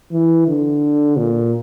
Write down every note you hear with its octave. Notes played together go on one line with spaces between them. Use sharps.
E3
D3
A#2